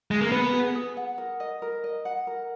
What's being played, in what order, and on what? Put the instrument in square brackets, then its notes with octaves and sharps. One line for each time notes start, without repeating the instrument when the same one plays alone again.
[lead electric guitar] G#3
A#3
[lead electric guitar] B3 [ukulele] B4
[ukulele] G#4
G#4
F#5
A#4
D#5
A#4
D#5
F#5
A#4